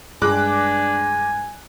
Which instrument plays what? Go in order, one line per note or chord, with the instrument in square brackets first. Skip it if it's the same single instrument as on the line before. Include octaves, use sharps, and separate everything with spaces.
[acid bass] G2 [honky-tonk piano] G#3 D6 F#6 [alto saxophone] D4 [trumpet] G#5